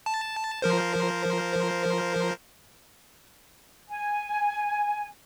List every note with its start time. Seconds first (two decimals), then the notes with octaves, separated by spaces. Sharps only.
0.06 A5
0.62 F3 A#4 C5
3.88 G#5